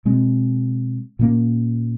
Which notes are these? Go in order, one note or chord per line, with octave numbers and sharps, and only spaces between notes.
B2 G#3 C4
A#2 G3 A#3 C#4